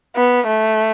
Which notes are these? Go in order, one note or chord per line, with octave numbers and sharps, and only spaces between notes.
B3
A3